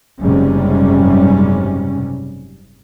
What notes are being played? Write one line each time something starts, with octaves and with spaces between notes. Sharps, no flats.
F#1 G#2 C3 G3 C#4